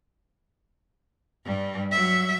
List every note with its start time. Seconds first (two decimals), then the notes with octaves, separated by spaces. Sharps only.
1.45 G2 G3
1.92 F#3 E5